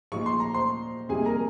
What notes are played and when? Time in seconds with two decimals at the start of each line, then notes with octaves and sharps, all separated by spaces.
0.12 A#2 F3 G#3 D#4 C#6
0.26 C6
0.40 A#5
0.54 C5 C6
1.09 F2 C3 G3 A#3 D#4 G#4 G#5
1.26 A#4 A#5